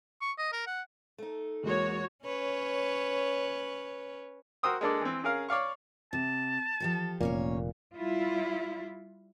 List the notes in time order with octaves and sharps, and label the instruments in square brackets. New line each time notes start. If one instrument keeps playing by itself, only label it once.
[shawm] C#6
D#5
A#4
F#5
[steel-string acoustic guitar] A3 D#4
[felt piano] E2 G#3 A#3 [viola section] F#4 C#5
[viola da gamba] C#4 B4 C#5
[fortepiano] F#4 A#4 C5 G5 D#6 E6
G#3 A#3 D4 A4 D5
E3 C4
C#4 G#4 A#4 F5
C#5 D5 F5 C#6
[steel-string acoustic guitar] C3 [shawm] A5
[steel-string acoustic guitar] F3 G4 A4
[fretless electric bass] F1 A#2 [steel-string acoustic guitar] A#3 C#4 C#5
[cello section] G3 E4 F4